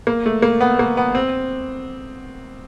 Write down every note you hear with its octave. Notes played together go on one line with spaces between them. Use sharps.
A#3
A3
A#3
B3
A#3
B3
C4